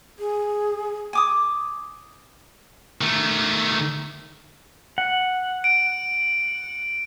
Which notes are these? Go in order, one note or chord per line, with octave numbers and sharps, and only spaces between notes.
G#4
G#5 D6 D#6
D#3 A3
F#5
D7